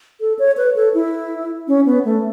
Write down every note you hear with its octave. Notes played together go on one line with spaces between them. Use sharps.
A4
C#5
B4
A4
E4
C#4
B3
A3